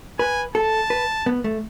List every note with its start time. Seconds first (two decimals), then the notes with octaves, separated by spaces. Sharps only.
0.19 B4 G#5
0.55 A4 A5
0.90 B4
1.26 B3
1.44 A3